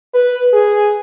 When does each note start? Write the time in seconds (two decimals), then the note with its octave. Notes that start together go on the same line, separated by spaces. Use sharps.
0.14 B4
0.53 G#4